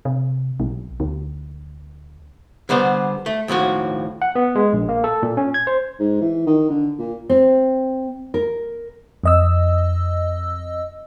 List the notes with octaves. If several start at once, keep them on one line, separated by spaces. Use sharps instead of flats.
C3
B1
D2
D3 G3 B3 C5
A3
D#2 A2 F3 F#4
F#5
B3
G#3
A#1
A#3
A4
A#2
C#4
G#6
C5
G#2
E3
D#3
D3
A#2
C4
A#4
F2 D#5 E6